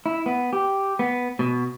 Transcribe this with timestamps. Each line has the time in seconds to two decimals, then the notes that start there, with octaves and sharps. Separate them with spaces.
0.06 E4
0.26 B3
0.53 G4
0.99 B3
1.39 B2